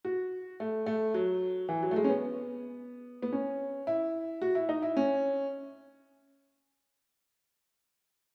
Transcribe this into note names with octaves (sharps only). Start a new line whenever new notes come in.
F#4
A3
A3
F#3
E3
F#3
A3
G#3
C#4
B3
B3
C#4
E4
F#4
E4
D#4
E4
C#4